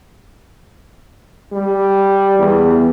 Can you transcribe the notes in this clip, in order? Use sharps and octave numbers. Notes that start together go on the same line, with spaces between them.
G3
E2